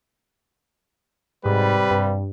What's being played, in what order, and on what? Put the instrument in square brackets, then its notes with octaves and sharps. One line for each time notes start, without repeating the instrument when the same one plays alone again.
[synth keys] G#2 [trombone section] C3 G3 [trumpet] B4
[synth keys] G2